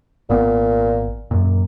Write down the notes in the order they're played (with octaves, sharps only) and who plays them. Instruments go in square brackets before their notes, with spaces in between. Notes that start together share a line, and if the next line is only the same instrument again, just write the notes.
[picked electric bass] G#1 B3 [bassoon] A#2
[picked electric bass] F#2 A#2